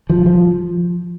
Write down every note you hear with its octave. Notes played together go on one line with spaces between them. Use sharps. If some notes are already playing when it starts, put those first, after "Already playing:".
F3
F3